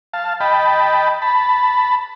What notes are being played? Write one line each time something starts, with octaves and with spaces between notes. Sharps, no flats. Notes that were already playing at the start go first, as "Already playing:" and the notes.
F5 A5
D#5 G5 A5 B5
A5 B5